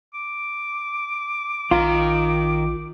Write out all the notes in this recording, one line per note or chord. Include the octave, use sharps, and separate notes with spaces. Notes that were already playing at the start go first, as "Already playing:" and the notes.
D6
A#1 D#3 F4 A#5